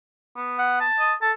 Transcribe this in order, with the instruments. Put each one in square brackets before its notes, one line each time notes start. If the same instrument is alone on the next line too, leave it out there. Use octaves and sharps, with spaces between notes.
[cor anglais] B3
[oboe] F#5
A5
[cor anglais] D#5
[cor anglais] A4 [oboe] A5